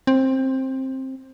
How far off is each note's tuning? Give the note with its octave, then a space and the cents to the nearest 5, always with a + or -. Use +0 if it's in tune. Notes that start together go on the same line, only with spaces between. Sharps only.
C4 +15